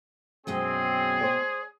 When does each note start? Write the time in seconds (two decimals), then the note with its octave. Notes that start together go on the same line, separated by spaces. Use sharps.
0.47 F#2 B2 G#3 C4 G#4 D#5
1.21 C5 D5